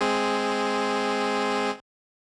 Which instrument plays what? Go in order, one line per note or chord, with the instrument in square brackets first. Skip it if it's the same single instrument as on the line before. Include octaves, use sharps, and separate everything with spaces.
[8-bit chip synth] G#3 C4 G#4